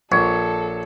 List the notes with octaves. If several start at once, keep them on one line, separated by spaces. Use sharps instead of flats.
A#1 A4 C#5